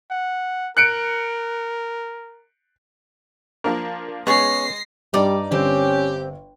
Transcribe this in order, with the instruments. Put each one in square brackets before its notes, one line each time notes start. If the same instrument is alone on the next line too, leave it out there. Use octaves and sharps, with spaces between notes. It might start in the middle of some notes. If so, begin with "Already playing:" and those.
[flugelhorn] F#5
[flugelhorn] A#4 [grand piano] F#6 C#7 D7
[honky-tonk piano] F3 A#3 D4 [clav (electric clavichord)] A#4
[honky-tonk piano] G#3 [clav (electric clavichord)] B3 C#4 [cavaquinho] G#4 C#5 [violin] A#6 C7
[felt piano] G2 [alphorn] G3 [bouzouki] D#4 D5
[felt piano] G1 [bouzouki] C4 [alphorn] C#4 [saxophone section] G4